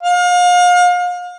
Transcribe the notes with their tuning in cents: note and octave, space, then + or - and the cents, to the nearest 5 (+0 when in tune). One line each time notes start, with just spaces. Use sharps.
F5 +35